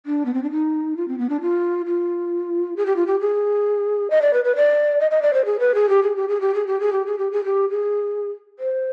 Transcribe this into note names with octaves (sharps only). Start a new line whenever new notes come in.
D4
B3
C4
D4
D#4
F4
C4
B3
D4
F4
F4
G#4
G4
F4
G4
G#4
D#5
D5
B4
B4
D5
D#5
D#5
D5
C5
G#4
B4
G#4
G4
G#4
G4
G#4
G4
G#4
G4
G#4
G4
G#4
G4
G#4
G4
G#4
C5